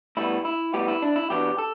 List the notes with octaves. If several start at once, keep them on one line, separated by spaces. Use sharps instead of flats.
A2 G3 B3 E4
E4
A2 G3 B3 G4
E4
D4
E4
E2 B2 B3 D4 G4
A4